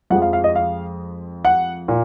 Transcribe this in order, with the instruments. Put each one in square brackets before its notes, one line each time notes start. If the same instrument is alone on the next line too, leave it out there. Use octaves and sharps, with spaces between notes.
[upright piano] F2 F3 G#3 F#5
F5
F5
D#5
F5
F#5
A#2